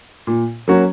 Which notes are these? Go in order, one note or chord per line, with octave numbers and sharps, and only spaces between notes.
A#2
F#3 A#3 C#4 F#4